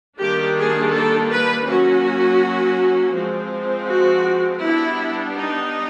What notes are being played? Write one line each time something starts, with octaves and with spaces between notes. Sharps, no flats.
D#3 G3 A#3 D4 G4
G#4
A4
B4
F#3 A#3 C#4 F#4
F3 G#3 C4
F#4
G3 B3 D4 E4
D#4